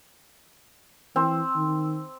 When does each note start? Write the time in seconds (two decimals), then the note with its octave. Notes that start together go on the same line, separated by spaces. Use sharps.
1.16 E3 C4
1.56 D#3